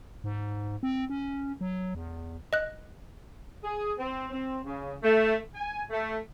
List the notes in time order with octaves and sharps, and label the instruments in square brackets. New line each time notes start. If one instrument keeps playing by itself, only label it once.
[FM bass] G#2
C4
C#4
F#3
E2
[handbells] D#5 F#6
[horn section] G#4
C4
C4
C#3
A3
G#5
A3